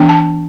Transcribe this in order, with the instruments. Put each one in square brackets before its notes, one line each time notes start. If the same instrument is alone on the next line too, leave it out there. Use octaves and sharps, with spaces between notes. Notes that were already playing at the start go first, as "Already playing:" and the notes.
Already playing: [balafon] E3 B3 D4
A5